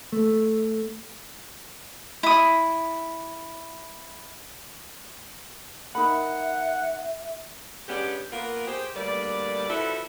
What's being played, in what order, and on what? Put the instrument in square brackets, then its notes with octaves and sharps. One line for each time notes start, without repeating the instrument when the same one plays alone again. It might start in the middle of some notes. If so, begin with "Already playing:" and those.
[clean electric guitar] A3
[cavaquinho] E4 D#6
[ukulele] D#4 A#4 B5 [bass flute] E5 [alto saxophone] F#5
[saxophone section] G#3 B3 C#4 D4 G4
A#3 B3 F4 A#4
G4 G#4 C5
D2 G3 A#3 B4 D5
F3 E4 F#4 A4 B4 E5